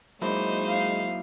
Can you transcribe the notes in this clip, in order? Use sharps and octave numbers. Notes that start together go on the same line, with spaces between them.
F#3 G#3 A#3 D#4 E4 C5
F5